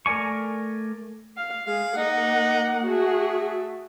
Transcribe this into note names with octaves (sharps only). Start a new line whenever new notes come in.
A3 A#4 D5 G#5 C#6
F5
G#3 G#4 F5
A#3 D#4 F#5
A3 F#4 G#4